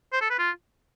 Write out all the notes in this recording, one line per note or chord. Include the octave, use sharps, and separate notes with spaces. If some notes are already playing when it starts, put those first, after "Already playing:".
C5
A4
B4
F4